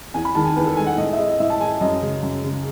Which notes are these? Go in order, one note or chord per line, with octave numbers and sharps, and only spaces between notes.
E2 G#5
B5
D#3 G#3 A5
G#5
E2 B4
A4
D#3 G#3 G#5
F#5
A2 D#5
E5
G#3 D#5
D#5
A2 E5
A5
G#3 G#5
F#2 D#5
C#3 G#3
F#2
C#3 G#3